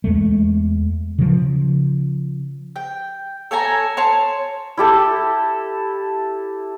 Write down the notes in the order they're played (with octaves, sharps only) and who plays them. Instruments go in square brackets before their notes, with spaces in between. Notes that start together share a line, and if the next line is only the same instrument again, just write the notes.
[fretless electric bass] E2 G#3 A3
C#3 F3
[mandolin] G5
A4 C#5 G#5 A#5
C#5 A5 C6
[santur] E4 G4 A4